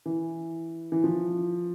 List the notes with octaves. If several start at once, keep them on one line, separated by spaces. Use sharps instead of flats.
E3
E3
F3